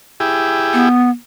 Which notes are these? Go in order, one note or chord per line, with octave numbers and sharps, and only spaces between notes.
E4 G4 G#4
B3